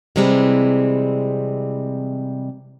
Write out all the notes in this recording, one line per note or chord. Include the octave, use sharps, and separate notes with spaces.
C3 E3 G3 G#3 C4